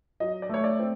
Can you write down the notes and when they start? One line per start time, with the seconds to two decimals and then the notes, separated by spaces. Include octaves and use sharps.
0.20 F#3 D#5
0.42 D5
0.49 A3 C#5
0.64 D5
0.79 C4